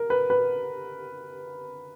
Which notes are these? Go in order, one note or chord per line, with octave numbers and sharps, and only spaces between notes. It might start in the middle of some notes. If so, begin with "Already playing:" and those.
Already playing: A#4
B4
B4